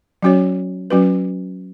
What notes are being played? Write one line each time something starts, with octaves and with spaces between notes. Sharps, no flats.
F#3 C#4 F#4 C#5
F#3 C#4 F#4 B4